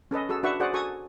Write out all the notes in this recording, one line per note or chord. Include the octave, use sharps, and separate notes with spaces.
C#4 A4 B4 D#5
F#4 G#4 A4 E6
D4 F#4 B4 E5 F#5 C#6
F#4 G#4 C5 D5 F#5
F#4 A4 G#5 C#6 D#6